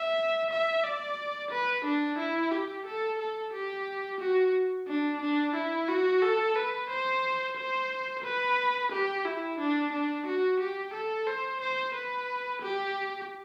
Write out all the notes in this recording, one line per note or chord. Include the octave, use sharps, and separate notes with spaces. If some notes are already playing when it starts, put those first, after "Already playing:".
Already playing: E5
E5
D5
B4
D4
E4
G4
A4
A4
G4
F#4
D4
D4
E4
F#4
A4
B4
C5
C5
B4
G4
E4
D4
D4
F#4
G4
A4
C5
C5
B4
G4